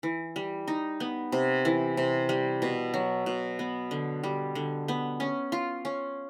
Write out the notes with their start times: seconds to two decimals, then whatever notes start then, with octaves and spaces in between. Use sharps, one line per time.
0.03 E3
0.36 G3
0.68 D#4
1.00 B3
1.32 C3
1.65 E3
1.97 C3
2.29 G3
2.62 B2
2.94 F#3
3.26 B2
3.59 B3
3.91 D3
4.24 G3
4.55 D3
4.88 B3
5.20 C#4
5.52 F4
5.85 C#4